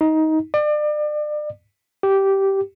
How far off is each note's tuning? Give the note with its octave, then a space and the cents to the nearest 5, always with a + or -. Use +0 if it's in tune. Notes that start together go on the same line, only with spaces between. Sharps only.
D#4 +15
D5 +35
G4 -10